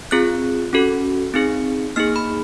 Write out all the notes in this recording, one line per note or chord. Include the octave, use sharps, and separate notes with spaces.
C4 F4 G#4 F#6
C#4 F#4 A4
C4 D#4 G#4
A#3 D#4 G#4 F6
B5